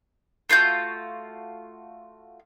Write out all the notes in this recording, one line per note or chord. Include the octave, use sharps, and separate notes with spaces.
A3 F4 F#4 G6